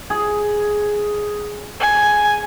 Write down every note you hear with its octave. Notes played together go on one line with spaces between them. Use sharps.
G#4
G#5